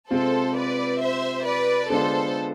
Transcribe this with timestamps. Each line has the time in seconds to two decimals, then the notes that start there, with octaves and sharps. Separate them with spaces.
0.11 C3 G#3 C4 F4 A4 C5
0.56 B4 D5
1.01 C5 E5
1.45 B4 D5
1.90 D3 G#3 B3 D4 F4 A4 C5